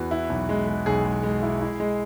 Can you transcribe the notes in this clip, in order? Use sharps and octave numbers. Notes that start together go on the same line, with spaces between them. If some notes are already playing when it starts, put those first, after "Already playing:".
Already playing: E2 F#4 B4
E4
B1
G#3
G#3
B1 G#4
G#3
G#3
E4
E4
G#3